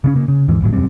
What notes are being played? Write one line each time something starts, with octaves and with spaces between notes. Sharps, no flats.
C#3 B3 C#4
C#3 A#3
C#3
D#2 G#2 E3
D1 G1 A2 F#3
E1 F#2 G3 C4